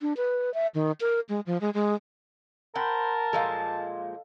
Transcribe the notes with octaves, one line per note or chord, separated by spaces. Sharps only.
D4
B4
E5
D#3
A#4
G#3
F3
G#3
G#3
A#4 C5 F#5 G5 A5 B5
A#2 F3 G#3 A4 D#5 F5